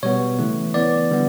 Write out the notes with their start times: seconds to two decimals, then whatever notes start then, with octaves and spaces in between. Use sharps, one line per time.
0.03 B2 G3 B3 C#5
0.39 C#3 E3 A3
0.74 E3 B3 D5
1.11 D3 G3 B3